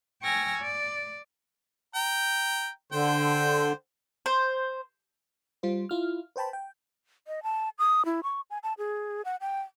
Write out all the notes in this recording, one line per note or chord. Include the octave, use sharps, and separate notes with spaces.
G5 G#5 C#6 E6 F6 A#6
D5
G5 A#5
D3 C5 G5
C5
G3 F4 C5
E4 F4 F6
B4 C5 G5 A5 B5
G5
D#5
A5
D#6
E4
C#6
G#5
A5
G#4
F#5
G5